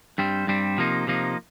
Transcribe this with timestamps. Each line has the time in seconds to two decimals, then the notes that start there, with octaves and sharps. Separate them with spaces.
0.18 G2 G3 C4
0.47 G2 G3 C4
0.78 C3 F3 A#3 D#4
1.07 C3 F3 A#3 D#4